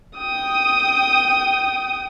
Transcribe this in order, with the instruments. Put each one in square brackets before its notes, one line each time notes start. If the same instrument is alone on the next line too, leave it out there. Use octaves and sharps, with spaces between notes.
[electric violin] G5 D#6